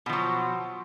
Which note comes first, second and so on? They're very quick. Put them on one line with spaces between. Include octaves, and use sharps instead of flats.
B2 F3 F#3